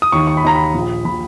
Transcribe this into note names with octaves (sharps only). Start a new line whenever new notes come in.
D#6
D#2 D#3 C#6
C#6
B5
D#2 D#3 A#5
B5
A#1 A#2
A#2 B5